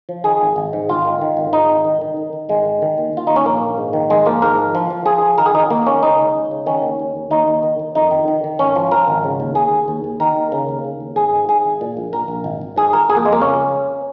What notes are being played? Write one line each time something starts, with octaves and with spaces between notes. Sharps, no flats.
F3
D#3 G#4
G#1
G#1
G#2
G#1 F4
D#3
D#3
G#1
G#2 D#4
G#1
D#3
D#3
D#3
D#3
G#1 G#3
D#3
D#3
D#2
D#2 F4
D#2 D#4
C#4
A#1 A#3
A#1
G#2
D#3
G#1 G#3
F3 A#3
G#2 A#4
F3
F3
F3
F3 G#4
F3
D#3 A#4
G#4
D#3 D#4
D#2 A#3
D#3 C#4
C#2 D#4
C#3
C#2
C#3
D#3 C#4
D#2
D#2
D#2
D#2 D#4
D#2
D#3
D#3
F2 D#4
D#3
D#3
D#3
G#1 C#4
F3
F3 A#4
G#1
C#3
D#2
D#2 G#4
D#2
D#2
D#2
D#3 A#4
D#2
C#3 A#4
D#2
C#3
D#2
G#1 G#4
G#2
G#2 G#4
G#1
A#2
A#1
A#1 A#4
A#1
G#1
G#1
G#2 G#4
G#1 A#4
F2 G#4
A#3
F2 G#3
A#3
C#3 C#4